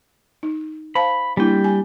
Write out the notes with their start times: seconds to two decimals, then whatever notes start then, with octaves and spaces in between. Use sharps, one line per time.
0.43 D#4
0.95 C5 F5 A5 B5
1.37 G3 A#3 D4 E4 G5
1.64 G#5